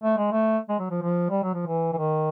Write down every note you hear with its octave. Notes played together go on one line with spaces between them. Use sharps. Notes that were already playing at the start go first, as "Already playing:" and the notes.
A3
G#3
A3
G#3
F#3
F3
F3
G3
F#3
F3
E3
E3
D#3